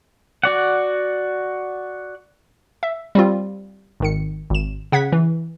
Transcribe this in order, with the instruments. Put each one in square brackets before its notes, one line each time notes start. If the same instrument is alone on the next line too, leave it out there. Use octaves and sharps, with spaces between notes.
[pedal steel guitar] F#4 D5 F#5
[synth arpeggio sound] E5
G3 C4 F4
G#1 D#3 C#7
G#1 E7
C#3 F#5 G#6 B6
E3